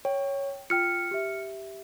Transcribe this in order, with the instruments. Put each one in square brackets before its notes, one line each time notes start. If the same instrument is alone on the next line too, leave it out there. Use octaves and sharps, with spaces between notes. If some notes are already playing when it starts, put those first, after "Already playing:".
[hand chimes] C#5 [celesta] G5
[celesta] F4 G5 [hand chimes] F6 C#7
[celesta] G4 E5